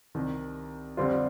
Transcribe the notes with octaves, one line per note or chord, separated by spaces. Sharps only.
C2 C3 D#3
F2 D3 G3 C4 F4